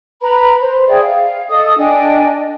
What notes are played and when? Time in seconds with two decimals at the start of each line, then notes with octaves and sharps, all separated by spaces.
0.22 B4 A#5 B5
0.61 C5
0.88 G#4 D5 E5 G5
1.03 F5
1.49 A4 D#5 D#6
1.78 D4 D#5 G5 G#5